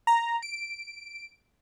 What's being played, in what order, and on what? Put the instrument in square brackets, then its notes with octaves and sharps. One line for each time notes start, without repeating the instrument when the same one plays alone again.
[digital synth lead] A#5
D7